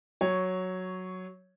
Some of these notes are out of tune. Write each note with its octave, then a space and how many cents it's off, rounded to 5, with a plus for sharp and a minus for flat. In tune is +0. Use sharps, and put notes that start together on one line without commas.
F#3 +0 C#5 +0